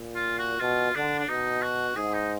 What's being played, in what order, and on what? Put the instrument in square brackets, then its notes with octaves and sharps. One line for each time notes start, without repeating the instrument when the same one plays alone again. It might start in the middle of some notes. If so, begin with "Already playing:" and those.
Already playing: [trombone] A#2
[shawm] F4
F#4
[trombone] B2 [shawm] F4
[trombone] D3 [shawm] D4
[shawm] D4
[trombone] B2 [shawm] D#4
[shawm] F#4
[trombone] G#2 [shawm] G#4
[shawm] D#4